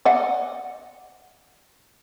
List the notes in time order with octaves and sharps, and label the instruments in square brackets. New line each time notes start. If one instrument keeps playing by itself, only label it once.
[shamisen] D5 D#5 F#5